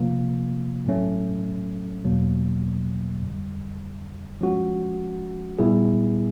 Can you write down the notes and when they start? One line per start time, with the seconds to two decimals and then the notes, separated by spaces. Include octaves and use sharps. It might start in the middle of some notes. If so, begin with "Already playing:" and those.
Already playing: C3 F3 A#3
0.86 A2 F#3 A3 C#4
2.05 E2 B2 F#3 A#3
3.22 F2 D3 G3
4.41 F3 G#3 C#4 F#4
5.59 A#2 G3 B3 E4 G#4